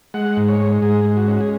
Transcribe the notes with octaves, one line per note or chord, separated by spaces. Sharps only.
G#3 F#5
G#2
C#5
G#3
G#2 G#4
G#3
F#4
C#4
G#4